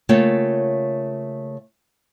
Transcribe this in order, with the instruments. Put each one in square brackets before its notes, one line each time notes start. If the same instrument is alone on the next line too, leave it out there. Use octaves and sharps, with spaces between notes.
[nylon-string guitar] C#3 A3 A#3 F4 C#5 G5